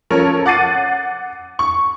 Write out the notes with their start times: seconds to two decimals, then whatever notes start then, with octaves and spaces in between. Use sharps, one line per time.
0.10 F3 C#4 A4 A#4 C#5
0.46 F#5 D6 A6 C7 D#7
1.59 C#6